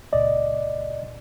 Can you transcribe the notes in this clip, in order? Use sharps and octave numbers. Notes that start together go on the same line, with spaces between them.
C#2 A#2 D5 D#5